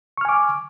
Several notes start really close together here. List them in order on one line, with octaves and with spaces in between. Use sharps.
C#6 F6 G#5 D6